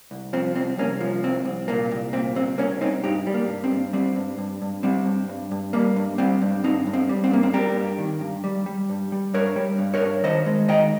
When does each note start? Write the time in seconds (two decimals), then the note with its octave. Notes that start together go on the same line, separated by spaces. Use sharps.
0.11 C2
0.33 F3 C4
0.55 C2 C4
0.78 C2 A#3 C#4
1.01 F3
1.23 C2 C4
1.45 C2
1.68 A#2 A#3
1.91 C2
2.13 A#2 C4
2.35 C2 C4
2.58 C2 A#3 C#4
2.81 C2 C4 D#4
3.04 G2 D#4 G4
3.27 G3
3.34 A#3
3.48 G2
3.64 C4
3.71 G2
3.93 G3 C4
4.16 G2
4.38 G2
4.62 G2
4.83 G3 C4
5.06 G2
5.29 G2
5.51 G2
5.73 G3 A#3
5.96 G2
6.18 G3 C4
6.42 G2
6.64 G2 C4 D#4
6.87 G2
6.93 C4
7.09 G3
7.24 C4
7.31 G2 A#3
7.43 C4
7.53 G3 G4 A#4
7.77 G2
7.98 D#3
8.21 G2
8.44 G3
8.66 G3
8.90 G2
9.12 G3
9.34 G2 A#4 C#5
9.56 G3
9.78 G2
9.94 A#4 C#5
10.01 G2
10.24 D#3 C5 D#5
10.46 G#3
10.69 D#3 D#5 G5